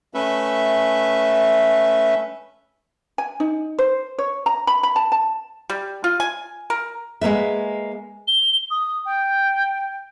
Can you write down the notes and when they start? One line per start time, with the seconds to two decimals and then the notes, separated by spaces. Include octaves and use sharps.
0.14 A3 C#4 B4 E5
3.18 G#5
3.40 D#4
3.79 C5
4.18 C#5
4.46 A#5
4.67 B5
4.83 B5
4.96 A5
5.12 A5
5.70 G3
6.04 F4
6.20 G#5
6.70 A#4
7.21 G#3 A#3 B4 E5
8.28 G7
8.71 D#6
9.05 G5